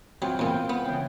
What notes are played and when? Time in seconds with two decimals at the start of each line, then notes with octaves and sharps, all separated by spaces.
0.22 E3 F#3 C4 F4 G5
0.39 E2 A#2 E4 F4
0.70 B3
0.86 C#3 E3 G5